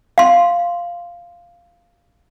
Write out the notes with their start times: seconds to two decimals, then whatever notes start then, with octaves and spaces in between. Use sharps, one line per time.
0.18 F5 C6